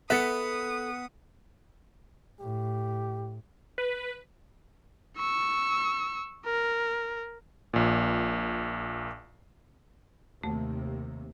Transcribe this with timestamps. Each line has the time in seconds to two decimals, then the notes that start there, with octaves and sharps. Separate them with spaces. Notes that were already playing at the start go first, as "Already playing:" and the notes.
0.10 B3 A4 E5 D#6 F#6 B6 C#7
2.40 A2 G4
3.78 B4
5.17 C#6 E6
6.45 A#4
7.73 A#1 A#2
10.43 D#2 C3 A3